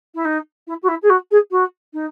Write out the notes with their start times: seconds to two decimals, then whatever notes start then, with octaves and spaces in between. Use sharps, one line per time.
0.14 E4
0.24 D#4
0.67 E4
0.82 F#4
0.88 E4
1.02 G#4
1.09 F#4
1.31 G#4
1.50 F#4
1.93 D#4